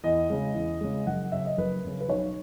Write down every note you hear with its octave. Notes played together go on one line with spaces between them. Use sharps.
E2 D#5
C#3 G#3
E2
C#3 G#3
F#1 F#5
F#2 C#3 E5
D#5
F#1 B4
F#2 C#3
B4
B1 C#5